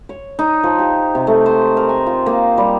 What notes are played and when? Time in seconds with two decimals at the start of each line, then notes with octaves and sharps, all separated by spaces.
0.09 C#5
0.39 D#4
0.64 F3
0.79 G4
1.15 C3
1.27 A3
1.46 C5
1.77 A#4
1.89 G#5
2.06 F4
2.26 A#3
2.58 G3